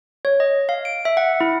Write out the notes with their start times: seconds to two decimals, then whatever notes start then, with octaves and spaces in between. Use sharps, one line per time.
0.25 C#5
0.40 D#5
0.69 F5
0.85 D7
1.05 E5
1.17 F#5
1.41 E4